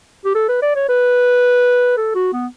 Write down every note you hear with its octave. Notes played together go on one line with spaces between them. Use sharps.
G4
A4
B4
D5
C#5
B4
A4
F#4
B3